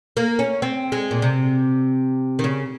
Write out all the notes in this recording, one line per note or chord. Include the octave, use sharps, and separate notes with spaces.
A#3
C#4
C4
G#3
A#2
C3
D#3
C#3